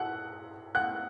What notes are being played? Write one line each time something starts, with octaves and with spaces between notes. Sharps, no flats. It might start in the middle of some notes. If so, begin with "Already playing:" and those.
Already playing: F#5 F#6
F#5 F#6